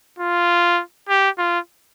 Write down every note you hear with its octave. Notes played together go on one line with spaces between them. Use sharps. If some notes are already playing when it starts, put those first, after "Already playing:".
F4
G4
F4